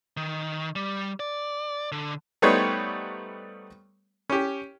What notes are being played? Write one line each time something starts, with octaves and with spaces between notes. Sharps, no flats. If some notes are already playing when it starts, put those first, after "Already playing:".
D#3
G3
D5
D3
G3 A3 B3 D#4 C5 C#5
C#4 G4